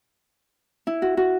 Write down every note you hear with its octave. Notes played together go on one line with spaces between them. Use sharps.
E4
F#4
F#4